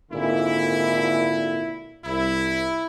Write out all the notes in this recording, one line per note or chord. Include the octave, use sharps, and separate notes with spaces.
G#1 A#2 D3 E4
C2 E4